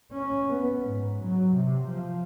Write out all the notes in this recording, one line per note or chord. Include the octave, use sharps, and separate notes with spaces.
C#4
B3
G#2
F#3
C3
F3